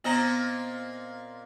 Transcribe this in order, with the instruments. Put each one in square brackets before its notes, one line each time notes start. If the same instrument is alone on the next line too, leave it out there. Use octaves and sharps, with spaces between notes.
[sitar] A#2 C4 D#5 [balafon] B3 A#5